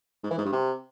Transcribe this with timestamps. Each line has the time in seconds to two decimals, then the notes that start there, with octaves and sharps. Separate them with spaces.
0.23 G#2
0.31 E3
0.38 G#2
0.45 G2
0.52 C3